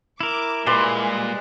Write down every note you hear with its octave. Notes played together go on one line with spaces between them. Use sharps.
E4 A#4 D6
A#2 G3 G#3 B4 D5 C6